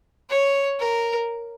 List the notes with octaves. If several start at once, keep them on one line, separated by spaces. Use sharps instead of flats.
C#5
A#4